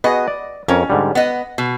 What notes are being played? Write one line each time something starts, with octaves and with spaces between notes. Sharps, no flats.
B3 F#4 G#4 D#5
D5
F2 C#4 A#4 C#5
G#2 D3 G3
B3 D#5 F#5
B2